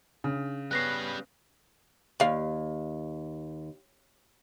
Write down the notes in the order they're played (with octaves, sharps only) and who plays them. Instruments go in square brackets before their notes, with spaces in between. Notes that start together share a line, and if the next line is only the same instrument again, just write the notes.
[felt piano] C#3 [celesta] D4
[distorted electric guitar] G3 B4 [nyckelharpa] B3 C#4 [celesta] F#6 A#6 C7
[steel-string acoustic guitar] D#2 [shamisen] D5 F5